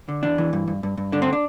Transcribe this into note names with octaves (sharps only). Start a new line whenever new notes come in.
D3
E2 D4
E3
G2
G2
G2
G2
D3 D4
C4
D4